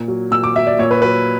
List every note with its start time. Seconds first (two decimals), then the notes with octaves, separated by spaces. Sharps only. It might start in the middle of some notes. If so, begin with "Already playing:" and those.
Already playing: A#2
0.08 F#3
0.31 A#2 E6
0.43 D6
0.55 F#3 E5
0.67 D5
0.79 A#2 C#5
0.91 B4
1.02 F#3 B4